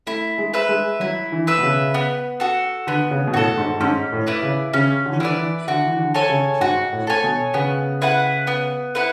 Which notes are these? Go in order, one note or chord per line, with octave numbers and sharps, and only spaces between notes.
A3 E4
G#3
B4 E5
G#3
F#3 E4
E3
B4 E5
B2
C#3
B3
F#4 A4
D3 B3
C#3
B2
A2 F#4 A4
G#2
G#2 C#4
A2
E4 B4 D5
C#3
C#3 C#4
D3
E3
D3 E4 B4 D5
E3
D3 F#4
E3
D3
A4 C#5 G#5
C#3
G#2 F#4
A2
A4 C#5 G#5
B2
C#3 B3
E4 B4 F#5
B3
E4 B4 F#5